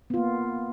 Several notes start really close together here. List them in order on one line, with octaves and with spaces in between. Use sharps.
B3 F4 A#3